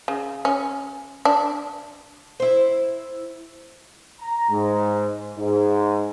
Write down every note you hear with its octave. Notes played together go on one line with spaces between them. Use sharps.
C#3
C#4
D4
E4 C5
A#5
G#2
G#2